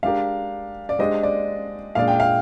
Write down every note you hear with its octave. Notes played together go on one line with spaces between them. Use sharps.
G#3 D4 G4 A#4 F5
D5
G#3 D4 G4 C5 D#5
D5
A#2 G#3 D4 G#4 D5 F5
G5
F5